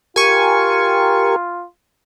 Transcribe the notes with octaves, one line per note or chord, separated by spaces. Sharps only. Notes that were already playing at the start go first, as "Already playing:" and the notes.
F4 G4 A#4 G#5 C#6